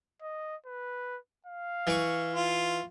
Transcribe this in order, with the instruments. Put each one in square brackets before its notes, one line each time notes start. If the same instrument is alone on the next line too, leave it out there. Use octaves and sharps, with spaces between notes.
[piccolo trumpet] D#5
B4
F5
[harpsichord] E3 C#6
[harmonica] F4